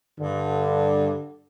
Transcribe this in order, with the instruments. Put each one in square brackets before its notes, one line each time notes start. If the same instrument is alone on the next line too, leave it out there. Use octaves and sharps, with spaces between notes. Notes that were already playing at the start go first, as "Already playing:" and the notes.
[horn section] G2 D3